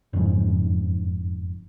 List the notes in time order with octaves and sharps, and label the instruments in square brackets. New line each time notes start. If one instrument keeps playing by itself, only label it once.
[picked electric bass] F#1 F2 G#2